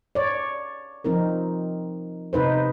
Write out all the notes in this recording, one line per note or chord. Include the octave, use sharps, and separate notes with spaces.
C#5 D5
F3 C4 D#4 A#4
C3 D#4 B4 C5